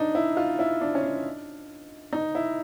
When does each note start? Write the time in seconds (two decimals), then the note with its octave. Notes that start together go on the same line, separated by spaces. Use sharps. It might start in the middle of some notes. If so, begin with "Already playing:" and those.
Already playing: D4 D#4
0.15 E4
0.37 F4
0.59 E4
0.81 D4
0.95 C#4
1.03 D4
2.13 D#4
2.35 E4